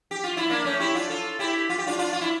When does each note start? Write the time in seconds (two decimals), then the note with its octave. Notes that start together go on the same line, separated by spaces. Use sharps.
0.11 G4
0.24 F4
0.37 E4
0.50 A#3 D4
0.64 A3 C#4
0.80 E4 G4
0.95 D4 F4
1.09 F4 A4
1.39 E4 G4
1.70 F4
1.78 G4
1.87 D4 F4
1.99 D4 F4
2.13 F4
2.21 E4